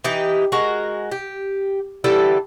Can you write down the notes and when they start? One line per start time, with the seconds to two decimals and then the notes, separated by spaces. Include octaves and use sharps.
0.04 E3 D#4 G4
0.52 G#3 F#4 A#4
1.12 G4
2.04 D3 E3 G3 A4